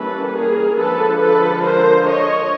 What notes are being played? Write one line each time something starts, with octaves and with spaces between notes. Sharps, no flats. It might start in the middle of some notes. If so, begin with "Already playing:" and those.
Already playing: E3 G3 A#3 C#4 A4 B4
G#4 A#4
D3 F3 G#3 A4 B4
A4 B4
A#4 C5
C#5 D#5